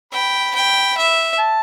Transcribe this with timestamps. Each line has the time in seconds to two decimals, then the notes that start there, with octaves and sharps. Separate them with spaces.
0.13 G5 B5
0.55 G5
0.98 E5
1.39 A5